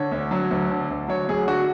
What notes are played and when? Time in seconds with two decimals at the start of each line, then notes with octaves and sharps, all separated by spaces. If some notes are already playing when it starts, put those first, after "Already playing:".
Already playing: D3 C#5
0.11 D2
0.31 F#3
0.51 D2
0.71 D3
0.90 D2
1.08 F#3 C#5
1.28 D2 G#4
1.47 D3 F#4